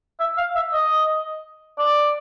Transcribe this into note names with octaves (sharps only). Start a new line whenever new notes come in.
E5
F5
E5
D#5
D5